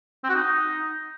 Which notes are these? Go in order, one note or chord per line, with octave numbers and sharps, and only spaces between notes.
C4
F#4
D#4